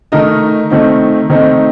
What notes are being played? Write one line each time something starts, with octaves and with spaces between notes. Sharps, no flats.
D#3 A3 D#4 A#4 D#5
D#3 A3 C4 D#4
D#3 A3 C4 D#4